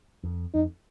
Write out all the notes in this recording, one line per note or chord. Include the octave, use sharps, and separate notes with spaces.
F2
F2 D#4